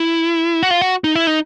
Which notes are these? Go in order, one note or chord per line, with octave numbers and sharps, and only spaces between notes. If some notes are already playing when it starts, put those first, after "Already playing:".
Already playing: E4
F#4
F4
F#4
D#4
E4
D#4